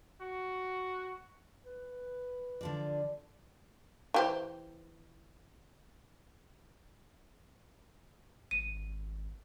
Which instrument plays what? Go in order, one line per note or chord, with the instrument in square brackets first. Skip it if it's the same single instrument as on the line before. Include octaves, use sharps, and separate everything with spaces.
[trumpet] F#4
[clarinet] B4
[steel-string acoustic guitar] D3 F3 D5
[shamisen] E3 G4 C5
[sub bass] G#1 [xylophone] D#7